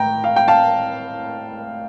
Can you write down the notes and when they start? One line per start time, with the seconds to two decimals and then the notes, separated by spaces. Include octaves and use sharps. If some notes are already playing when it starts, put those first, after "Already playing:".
Already playing: A2 G5 A#5
0.24 F5
0.36 G5
0.48 F5 A5